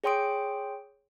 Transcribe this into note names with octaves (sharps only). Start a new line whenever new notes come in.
G#4 C#5 G5 C6 D#6 D7